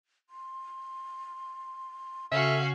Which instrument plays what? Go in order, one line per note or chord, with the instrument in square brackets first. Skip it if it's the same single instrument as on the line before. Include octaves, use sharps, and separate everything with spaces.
[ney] C6
[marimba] C#3 [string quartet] C#4 F#4 F5 [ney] A4 [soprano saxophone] E5